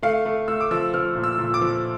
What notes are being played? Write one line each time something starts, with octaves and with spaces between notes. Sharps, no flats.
A3 F5
A3
A3 E6
D6
F3 E6
F3 F6
A#2
E6
A#2
D6
F3